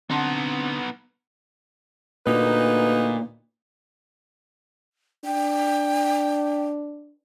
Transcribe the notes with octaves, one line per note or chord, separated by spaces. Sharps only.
D3 B3 C4 D#4 F#5 A5 C6
D2 A#2 D#4 B4
D4 G5